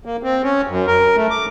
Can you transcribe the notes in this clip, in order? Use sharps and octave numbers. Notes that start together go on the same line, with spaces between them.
A#3
C4
C#4
F#2
A#4
A3
D6